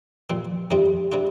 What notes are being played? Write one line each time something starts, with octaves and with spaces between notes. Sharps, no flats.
A#2 F3 C4
F2 C3 G3 D4 F4
C3 G3 D4 F4